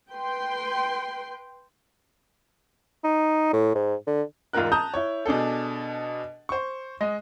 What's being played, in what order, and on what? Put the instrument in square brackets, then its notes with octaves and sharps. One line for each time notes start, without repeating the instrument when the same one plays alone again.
[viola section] B4 G5 C6
[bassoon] D#4
A2
G#2
D3
[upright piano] E1 G#2 F4 A#4 F#6
A5 A#5 D#6 G6
E4 C#5
B2 D4 G#4 A4
C5 C#6
G#3 D#5